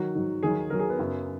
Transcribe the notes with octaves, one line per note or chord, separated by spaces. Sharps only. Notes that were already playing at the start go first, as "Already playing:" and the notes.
Already playing: D#3 F#3 F#4
G#2 D#3 F#3
D#2 D#3 F#3 G#4
D#2 D#3 F#3 A#4
G#4
B3
F#2 C#3 F#3